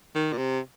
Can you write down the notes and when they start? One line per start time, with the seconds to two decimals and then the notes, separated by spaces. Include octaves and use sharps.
0.15 D#3
0.33 A#2
0.38 C3